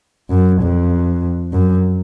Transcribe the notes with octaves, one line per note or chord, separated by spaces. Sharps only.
F#2
F2
F#2